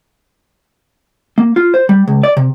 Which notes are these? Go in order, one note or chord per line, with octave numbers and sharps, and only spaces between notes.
A#3
F4
C5
G3
C#2
D5
C3